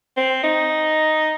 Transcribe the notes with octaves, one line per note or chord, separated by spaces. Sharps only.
C4
D#4